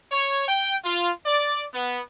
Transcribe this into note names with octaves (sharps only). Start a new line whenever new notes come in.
C#5
G5
F4
D5
B3